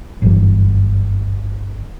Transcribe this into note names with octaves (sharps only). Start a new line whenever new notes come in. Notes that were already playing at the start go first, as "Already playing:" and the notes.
G1 F#2 E3